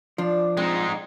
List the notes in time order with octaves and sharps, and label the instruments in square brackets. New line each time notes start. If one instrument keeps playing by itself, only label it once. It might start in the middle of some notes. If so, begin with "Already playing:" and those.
[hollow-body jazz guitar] F3 [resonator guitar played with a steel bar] D4
[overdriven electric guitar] G#3 D#4 [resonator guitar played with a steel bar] C4